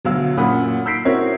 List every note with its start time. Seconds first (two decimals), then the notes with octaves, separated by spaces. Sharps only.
0.05 D2 B2 F#3 F5 E6
0.37 F#2 A#2 F#5 B5 D#6
0.86 E6 G6 B6 C7 D7
1.05 C4 E4 F#4 A#4 C#5